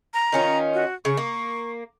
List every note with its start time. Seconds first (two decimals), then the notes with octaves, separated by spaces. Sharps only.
0.14 A#5
0.33 D#3 C#4 F4
0.74 F#4
1.05 C#3 C#6
1.17 A#3